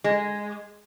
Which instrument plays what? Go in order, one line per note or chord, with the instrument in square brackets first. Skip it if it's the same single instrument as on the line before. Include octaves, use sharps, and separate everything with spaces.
[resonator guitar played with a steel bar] G#3